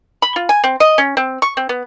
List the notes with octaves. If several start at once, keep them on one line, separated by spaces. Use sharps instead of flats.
B5
F4
G#5
C4
D#5
C#4
C4
C#6
C4
B3